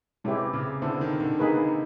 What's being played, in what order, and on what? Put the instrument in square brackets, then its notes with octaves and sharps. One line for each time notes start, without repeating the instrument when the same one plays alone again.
[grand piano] C3 [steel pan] G#3 C#4 E4 G4 B4
[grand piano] C#3
[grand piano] D3 [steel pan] B3 E4 A4 C5
[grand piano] D#3
D3
[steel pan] A#3 D#4 G#4 B4